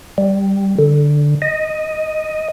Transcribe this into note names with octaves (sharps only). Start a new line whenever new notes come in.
G3
D3
D#5